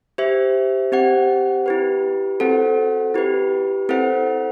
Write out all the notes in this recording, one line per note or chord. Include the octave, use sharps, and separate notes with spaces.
G4 C5 E5
C4 G4 C5 F#5
E4 G4 B4
C4 F#4 A4 C5 F#5
E4 G4 B4
C4 E4 A4 C5 F#5